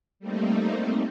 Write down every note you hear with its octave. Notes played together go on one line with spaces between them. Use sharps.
G3 A3 A#3 C4 D#4